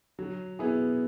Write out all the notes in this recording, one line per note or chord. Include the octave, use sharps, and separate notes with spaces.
F#3
B3 E4 G#4